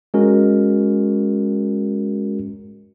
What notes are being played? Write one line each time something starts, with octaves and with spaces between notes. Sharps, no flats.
G#3 C#4 F#4 A#4